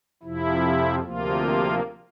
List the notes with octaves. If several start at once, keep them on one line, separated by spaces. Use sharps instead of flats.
F2 C3 F3 E4
D2 C3 F3 A#3 F4